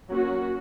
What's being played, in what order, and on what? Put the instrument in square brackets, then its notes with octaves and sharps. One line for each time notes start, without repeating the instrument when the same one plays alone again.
[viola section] F#3 A#3 C#4 F#4